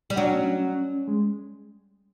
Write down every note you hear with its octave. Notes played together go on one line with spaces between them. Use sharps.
G3
F#3 D4
C#4
G#3